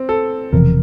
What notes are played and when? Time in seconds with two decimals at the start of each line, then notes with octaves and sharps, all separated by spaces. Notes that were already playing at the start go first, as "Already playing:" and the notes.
Already playing: C4
0.09 A4
0.52 E1 E2 C3 F3 A#4